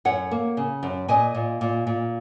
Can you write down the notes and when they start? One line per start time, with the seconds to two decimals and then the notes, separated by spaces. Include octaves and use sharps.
0.05 F#2 C#5 F#5
0.31 A#3
0.57 C#3
0.83 F#2
1.08 A#2 D#5 G#5
1.35 A#2
1.61 A#2
1.87 A#2